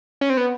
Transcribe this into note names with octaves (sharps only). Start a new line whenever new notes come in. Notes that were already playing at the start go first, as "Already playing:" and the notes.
C#4
C4
B3